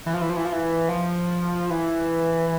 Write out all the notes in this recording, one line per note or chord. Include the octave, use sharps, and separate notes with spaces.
E3
F3
E3
F3
E3
F3
E3
F3
E3